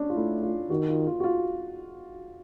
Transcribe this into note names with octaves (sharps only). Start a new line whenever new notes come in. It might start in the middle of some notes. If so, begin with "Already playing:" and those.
Already playing: C#4 D4
F4
A3 E4
F4
D#3 F#4
F4
F4
F#4
F4